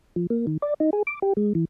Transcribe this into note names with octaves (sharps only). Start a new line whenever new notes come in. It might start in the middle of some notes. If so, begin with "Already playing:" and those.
F3
A#3
D#3
D5
D#4
G#4
D6
G4
G#3
E3